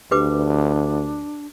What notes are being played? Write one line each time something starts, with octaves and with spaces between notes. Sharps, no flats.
D2 D4 G4 B4 D6